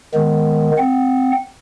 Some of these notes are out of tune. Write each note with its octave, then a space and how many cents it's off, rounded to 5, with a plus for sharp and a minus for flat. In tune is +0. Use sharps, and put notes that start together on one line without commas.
D#3 +0 G#3 +0 B3 +0
C4 -10 F#5 -15